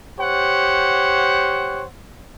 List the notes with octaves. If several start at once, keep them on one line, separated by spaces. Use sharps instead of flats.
G4 C5 C#5 F#5